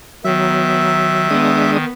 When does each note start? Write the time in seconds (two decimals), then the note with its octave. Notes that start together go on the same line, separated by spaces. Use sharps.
0.24 D#3 F#3 B3 E5
1.30 G#3 B3 D4 D#6